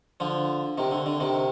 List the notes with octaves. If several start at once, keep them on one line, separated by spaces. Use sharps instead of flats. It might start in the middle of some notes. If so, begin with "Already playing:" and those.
D3 F3
C3 D#3
D3
D3
C3 D#3